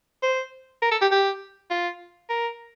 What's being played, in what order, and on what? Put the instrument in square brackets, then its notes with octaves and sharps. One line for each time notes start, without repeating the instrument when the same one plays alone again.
[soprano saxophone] C5
A#4
A4
G4
G4
F4
A#4